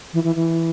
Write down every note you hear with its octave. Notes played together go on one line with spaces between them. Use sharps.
E3
E3
E3